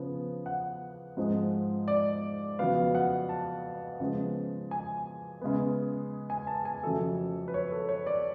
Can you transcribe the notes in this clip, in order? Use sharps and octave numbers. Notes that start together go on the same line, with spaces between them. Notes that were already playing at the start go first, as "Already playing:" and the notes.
Already playing: C#3 F3 B3
F#5
G#2 F3 G#3
D5
F2 C#3 F#3 B3 F5
F#5
A5
C#3 F3 G#3 B3
G#5
C#3 G#3 B3
G#5
A5
G#5
F2 C#3 F#3 A3 A4
B4
C#5
A4
C#5
D5